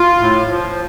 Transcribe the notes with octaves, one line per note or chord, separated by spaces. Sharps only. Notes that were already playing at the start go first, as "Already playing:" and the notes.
Already playing: F4
A2
F3